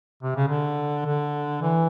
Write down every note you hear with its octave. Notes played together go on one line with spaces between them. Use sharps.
C3
C#3
D3
D3
E3